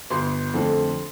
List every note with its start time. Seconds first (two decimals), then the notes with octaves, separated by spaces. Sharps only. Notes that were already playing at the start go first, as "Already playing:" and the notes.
0.10 G1 C6
0.54 F2 D3 A3